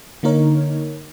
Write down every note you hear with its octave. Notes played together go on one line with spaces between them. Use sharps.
D3 A#3 D#4 A#4 C#5